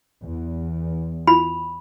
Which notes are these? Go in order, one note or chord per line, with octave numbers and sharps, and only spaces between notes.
E2
E4 F4 B5